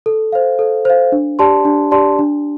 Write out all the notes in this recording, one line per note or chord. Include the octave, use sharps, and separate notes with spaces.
A4
C5 F5
A4
C5 F5
D4
G4 D5 A5 C6
D4
G4 D5 A5 C6
D4